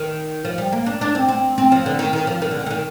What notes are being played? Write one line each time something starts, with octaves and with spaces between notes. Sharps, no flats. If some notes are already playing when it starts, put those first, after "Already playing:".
Already playing: D#3
F3
G3
A#3
D4
D4
C4
C4
C4
F3
D3
D#3
D#3
F3
D#3
D3
D#3
D3
D#3